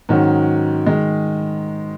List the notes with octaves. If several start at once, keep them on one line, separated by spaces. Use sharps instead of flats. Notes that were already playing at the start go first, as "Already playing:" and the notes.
G#2 D#3 F#3 C#4 F#4
D#3 G#3